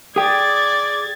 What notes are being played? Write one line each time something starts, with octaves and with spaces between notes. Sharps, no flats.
G#4 D5 G5 G#6 A6